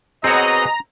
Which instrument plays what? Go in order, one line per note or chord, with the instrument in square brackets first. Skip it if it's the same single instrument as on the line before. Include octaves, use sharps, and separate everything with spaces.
[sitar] B3 F#4 G#4 [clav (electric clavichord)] C4 C#5 [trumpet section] D#5 [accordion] A#5